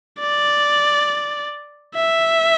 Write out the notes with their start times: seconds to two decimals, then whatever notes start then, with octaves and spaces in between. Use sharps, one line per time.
0.20 D5
1.95 E5